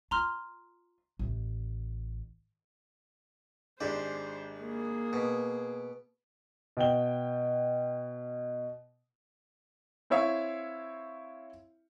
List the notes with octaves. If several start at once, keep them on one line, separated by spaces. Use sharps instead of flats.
F4 A#5 C6 F6
A1 A3
G#1 G#3 D4 G4 C5
A#3 G#4
B2
B2 G5 G7
C4 E4 C#5 E5 F5